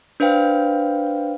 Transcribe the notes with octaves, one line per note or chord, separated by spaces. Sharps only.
D4 B4 C5 F5 G5